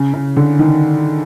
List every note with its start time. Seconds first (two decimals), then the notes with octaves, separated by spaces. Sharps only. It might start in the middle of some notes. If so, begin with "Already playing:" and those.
Already playing: C#3
0.14 C#3
0.37 D3
0.59 D#3